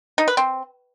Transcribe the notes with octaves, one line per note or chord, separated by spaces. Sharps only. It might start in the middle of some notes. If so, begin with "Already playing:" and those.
D#4
B4
C4